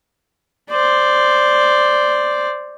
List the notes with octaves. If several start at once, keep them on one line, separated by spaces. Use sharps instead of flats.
C5 D5